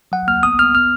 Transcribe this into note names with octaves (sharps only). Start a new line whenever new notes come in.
F#3 F#5
A#3 F6
B3 D#6
B3 F6
B3 F6